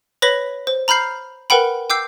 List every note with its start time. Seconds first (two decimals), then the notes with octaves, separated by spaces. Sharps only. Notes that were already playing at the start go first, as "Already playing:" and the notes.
0.22 B4 C#5 B5 A#6 B6 F#7
0.67 C5
0.88 A#5 B5 F6 G6 C7
1.50 A#4 B4 F#5 G5 B5
1.90 G5 D6 E6 G6 C7